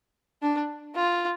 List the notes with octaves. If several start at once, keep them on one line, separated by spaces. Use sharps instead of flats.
D4
F4